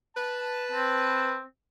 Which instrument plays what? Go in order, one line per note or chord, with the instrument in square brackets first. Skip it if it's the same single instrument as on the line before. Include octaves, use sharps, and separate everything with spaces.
[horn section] B4 A5
[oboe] C4